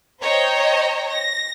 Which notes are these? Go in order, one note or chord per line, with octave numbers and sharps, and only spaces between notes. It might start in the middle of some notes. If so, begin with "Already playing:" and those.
C5 C#5 D#5 G5 A#5
A#6